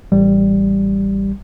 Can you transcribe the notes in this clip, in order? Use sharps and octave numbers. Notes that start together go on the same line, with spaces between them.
A1 G3